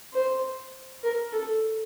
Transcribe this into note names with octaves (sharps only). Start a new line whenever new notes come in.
C5
A#4
A4